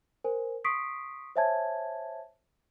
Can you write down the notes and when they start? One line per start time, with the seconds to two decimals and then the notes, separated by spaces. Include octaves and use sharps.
0.24 A#4 C5 G#5
0.64 C6 C#6 D#6 B6 C7 D7
1.36 C5 C#5 E5 G#5 A5 G#6